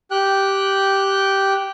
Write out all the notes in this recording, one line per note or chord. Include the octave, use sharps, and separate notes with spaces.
G4 G5 F#6